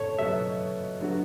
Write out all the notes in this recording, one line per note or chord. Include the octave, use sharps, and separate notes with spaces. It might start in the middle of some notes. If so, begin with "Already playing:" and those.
Already playing: A4 C#5
B2 F#3 B3 E5
D3 F#3 B3 F#4